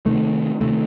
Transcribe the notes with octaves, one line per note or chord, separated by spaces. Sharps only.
C3 D#3 A3
C3 D#3 A3